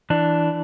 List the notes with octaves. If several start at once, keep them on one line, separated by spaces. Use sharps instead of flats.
E3 D4